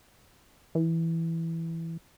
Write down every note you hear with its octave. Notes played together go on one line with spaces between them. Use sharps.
E3